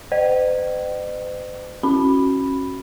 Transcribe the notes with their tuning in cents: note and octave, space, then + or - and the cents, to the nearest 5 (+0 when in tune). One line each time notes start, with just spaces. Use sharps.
C5 -40 D#5 -45 G5 -40
C#4 -25 F#4 +5 B5 +0